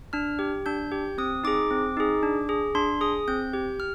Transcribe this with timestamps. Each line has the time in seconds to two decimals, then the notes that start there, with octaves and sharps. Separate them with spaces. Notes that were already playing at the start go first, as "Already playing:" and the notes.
0.13 D4 F6
0.39 G4
0.66 D4 G6
0.92 G4
1.18 C4 D#6
1.44 D#4 G#4 D6
1.71 C4
1.97 D#4 G#4
2.23 D4
2.49 G#4
2.75 D4 C6
3.01 G#4 D#6
3.28 C4 G6
3.54 G4
3.80 F6